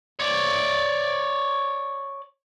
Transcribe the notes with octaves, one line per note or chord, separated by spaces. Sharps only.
C#5 D5